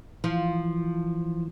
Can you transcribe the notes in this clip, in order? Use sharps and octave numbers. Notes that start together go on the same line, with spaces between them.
E3 F3